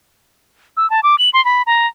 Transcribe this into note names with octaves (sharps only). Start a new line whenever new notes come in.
E6
A5
D6
F#7
C6
B5
A#5